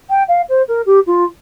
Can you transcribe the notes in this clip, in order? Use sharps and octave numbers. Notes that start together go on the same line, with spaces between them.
G5
F5
C5
A#4
G4
F4